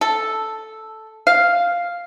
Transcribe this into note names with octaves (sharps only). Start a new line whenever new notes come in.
A4
F5